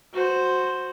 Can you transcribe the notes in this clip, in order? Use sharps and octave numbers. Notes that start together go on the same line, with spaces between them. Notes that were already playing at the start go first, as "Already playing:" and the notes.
F#4 C5